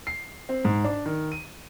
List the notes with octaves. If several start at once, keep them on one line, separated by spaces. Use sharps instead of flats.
C7
C4
G#2
D4
D#3
D#7